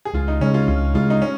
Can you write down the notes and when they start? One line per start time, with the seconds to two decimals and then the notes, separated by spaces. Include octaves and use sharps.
0.05 G#4
0.13 C#2 F4
0.28 D#4
0.41 C#3 G#3 C#4
0.54 F4
0.68 C#2 F4
0.94 C#3 G#3 F4
1.10 D#4
1.22 C#4